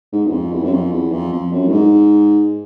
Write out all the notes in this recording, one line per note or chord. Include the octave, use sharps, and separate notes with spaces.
G#2
E2
F2
E2
F#2
F2
E2
F2
F2
F#2
A2
G#2